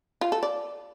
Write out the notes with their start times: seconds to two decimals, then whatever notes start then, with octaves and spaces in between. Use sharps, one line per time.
0.21 F4
0.32 A4
0.43 D5